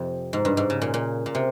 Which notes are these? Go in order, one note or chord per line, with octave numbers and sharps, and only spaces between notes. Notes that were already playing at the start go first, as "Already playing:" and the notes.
Already playing: F2 C3
G#2
G2
G#2
C#3
A#2
A#2
A#2
C3